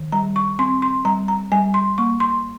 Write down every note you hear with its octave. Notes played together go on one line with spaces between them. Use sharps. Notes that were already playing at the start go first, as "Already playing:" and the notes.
Already playing: D#3
G3 A#5
C#6
C4 C6
C6
G3 A#5
A#5
G3 G#5
C6
A#3 C#6
C6